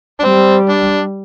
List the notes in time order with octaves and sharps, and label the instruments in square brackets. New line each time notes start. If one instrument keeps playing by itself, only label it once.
[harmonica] D4
[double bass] G3 [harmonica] C4
[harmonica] D4